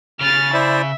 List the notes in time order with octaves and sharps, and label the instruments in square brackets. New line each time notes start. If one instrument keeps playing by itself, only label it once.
[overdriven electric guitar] C#3 [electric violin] F6 A6
[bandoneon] E4 C5 D5 [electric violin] E5